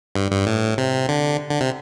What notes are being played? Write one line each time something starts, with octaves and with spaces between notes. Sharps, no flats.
G2
G2
A2
C3
D3
D3
C3